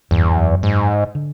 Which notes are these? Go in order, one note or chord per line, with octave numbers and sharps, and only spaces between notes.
F#1 E2 G2
F#2
G#2
D3